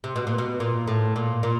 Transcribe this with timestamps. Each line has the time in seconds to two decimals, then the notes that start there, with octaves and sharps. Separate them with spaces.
0.04 C3
0.16 B2
0.27 A#2
0.38 B2
0.60 A#2
0.87 A2
1.16 A#2
1.43 A#2